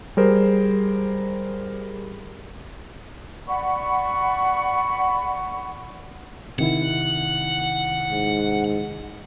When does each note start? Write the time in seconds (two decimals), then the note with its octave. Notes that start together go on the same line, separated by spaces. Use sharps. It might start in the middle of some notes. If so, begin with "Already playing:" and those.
0.17 G3 G#4 A#4 C5
3.47 D5 F#5 B5 C#6
6.59 C3 D#3 E4 F#5
8.11 G#2